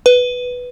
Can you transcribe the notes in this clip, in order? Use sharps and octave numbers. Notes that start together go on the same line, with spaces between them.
B4